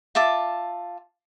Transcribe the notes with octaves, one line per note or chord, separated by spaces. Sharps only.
F4 E5 A5 D6